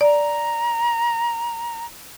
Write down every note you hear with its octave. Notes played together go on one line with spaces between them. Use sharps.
D5 A#5